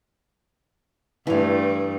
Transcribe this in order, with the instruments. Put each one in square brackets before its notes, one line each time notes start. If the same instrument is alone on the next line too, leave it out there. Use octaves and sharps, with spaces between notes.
[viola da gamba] G2 A3 [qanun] E3 F5